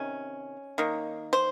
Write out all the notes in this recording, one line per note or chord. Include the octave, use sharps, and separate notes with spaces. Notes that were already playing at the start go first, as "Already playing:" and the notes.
Already playing: C3 D#3 C#4
D#3 A#3
C5